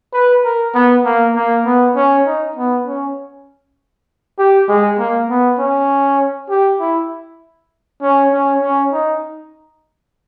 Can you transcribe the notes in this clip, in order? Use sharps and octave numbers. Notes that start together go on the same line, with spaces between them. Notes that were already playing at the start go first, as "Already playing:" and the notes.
B4
A#4
B3
A#3
A#3
B3
C#4
D#4
B3
C#4
G4
G#3
A#3
B3
C#4
G4
E4
C#4
C#4
C#4
D#4